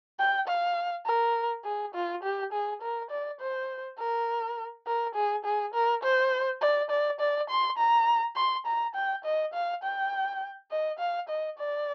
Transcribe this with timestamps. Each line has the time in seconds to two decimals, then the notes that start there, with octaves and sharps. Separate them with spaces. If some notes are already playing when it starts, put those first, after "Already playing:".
0.19 G5
0.48 F5
1.06 A#4
1.65 G#4
1.94 F4
2.23 G4
2.53 G#4
2.82 A#4
3.11 D5
3.40 C5
3.99 A#4
4.87 A#4
5.15 G#4
5.45 G#4
5.74 A#4
6.03 C5
6.61 D5
6.90 D5
7.20 D5
7.50 C6
7.78 A#5
8.36 C6
8.66 A#5
8.95 G5
9.25 D#5
9.54 F5
9.83 G5
10.71 D#5
10.99 F5
11.29 D#5
11.58 D5